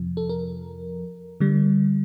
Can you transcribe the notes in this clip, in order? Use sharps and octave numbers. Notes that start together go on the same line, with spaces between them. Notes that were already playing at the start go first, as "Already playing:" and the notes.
Already playing: F2 C3 F3
A4
A#4
D3 G3